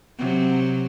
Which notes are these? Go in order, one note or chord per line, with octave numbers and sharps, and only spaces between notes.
C3 F#3